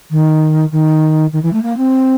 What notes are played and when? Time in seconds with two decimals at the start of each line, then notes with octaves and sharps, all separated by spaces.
0.11 D#3
0.71 D#3
1.32 D#3
1.42 E3
1.53 A3
1.62 A#3
1.77 C4